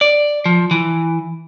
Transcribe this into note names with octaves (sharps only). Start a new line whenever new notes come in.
D5
F3
E3